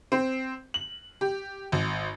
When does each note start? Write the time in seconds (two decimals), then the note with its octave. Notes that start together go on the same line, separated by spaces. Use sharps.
0.12 C4
0.74 F#7
1.21 G4
1.72 G#1